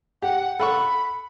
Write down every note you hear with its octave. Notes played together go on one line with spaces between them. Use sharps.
G4 F#5
A4 F#5 B5 C#6